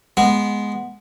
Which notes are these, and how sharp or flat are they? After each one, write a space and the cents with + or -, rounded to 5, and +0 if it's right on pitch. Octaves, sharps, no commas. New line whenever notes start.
G#3 +0 B3 -10